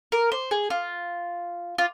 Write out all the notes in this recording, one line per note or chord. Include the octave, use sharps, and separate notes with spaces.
A#4
C5
G#4
F4
F4